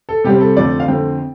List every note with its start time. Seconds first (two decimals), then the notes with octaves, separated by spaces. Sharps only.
0.09 A4
0.24 C3 G3 C4 G4
0.40 A4
0.57 F2 D3 A3 C4 D5
0.80 F5
0.88 F2 D3 A3 C4 G5